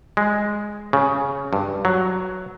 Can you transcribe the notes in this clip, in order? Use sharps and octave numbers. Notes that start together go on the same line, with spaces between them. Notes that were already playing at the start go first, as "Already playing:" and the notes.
G#3
C#3
G2
F#3